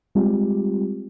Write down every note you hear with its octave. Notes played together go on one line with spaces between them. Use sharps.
G3 G#3 C4 F4 G4